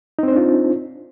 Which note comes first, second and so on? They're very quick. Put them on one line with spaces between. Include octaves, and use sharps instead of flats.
D#4 C4 C5 D4 F4